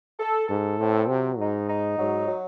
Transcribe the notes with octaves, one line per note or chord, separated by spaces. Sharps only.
A4
G#2 A4
A2 C4
C3 F#3
G#2 D#4
D#4
G#2 F#3
F#3